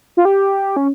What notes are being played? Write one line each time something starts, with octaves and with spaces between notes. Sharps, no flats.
F4
G4
C#4